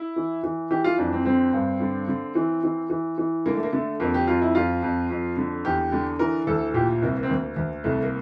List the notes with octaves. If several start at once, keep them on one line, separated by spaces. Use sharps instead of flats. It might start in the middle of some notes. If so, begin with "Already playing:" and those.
Already playing: E4
E3
E3
E3 G4
F4
F2 D4
C4
D3 C4
G2
D3
D3
E3
E3
E3
E3
D3 A#3
A3
A#3
D3 A3
F2 A#3
G4
F2 F4
E4
F2 F4
F2
F2
D3
E2 G4
D3
E3 A#4
D2 A4
A#2 G4
C2 A#3
A#3
C4
D2 A#3
D2
C2 A3
A#3